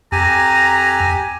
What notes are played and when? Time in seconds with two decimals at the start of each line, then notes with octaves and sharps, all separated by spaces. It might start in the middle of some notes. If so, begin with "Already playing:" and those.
0.12 F2 G4 G#5 A#5